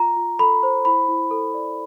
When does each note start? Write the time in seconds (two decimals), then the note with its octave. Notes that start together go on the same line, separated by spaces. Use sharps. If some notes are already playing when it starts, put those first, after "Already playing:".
Already playing: F4 A#5
0.16 F4
0.39 A4 B5
0.63 C5
0.85 E4 B5
1.08 E4
1.31 A4
1.54 D5